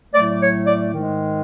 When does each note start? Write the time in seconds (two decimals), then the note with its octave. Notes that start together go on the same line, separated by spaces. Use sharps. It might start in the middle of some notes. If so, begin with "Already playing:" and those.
0.14 A2 F#3 A3 D5
0.41 C#5
0.66 D5
0.92 G#2 D#3 G#3